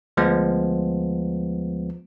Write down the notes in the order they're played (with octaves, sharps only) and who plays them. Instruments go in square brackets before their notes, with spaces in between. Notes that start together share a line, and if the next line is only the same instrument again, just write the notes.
[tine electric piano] D2 F3 G#3 B3